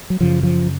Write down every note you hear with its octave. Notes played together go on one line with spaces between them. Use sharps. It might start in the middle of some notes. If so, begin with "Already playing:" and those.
F#3
F#2 C#3 F3
F3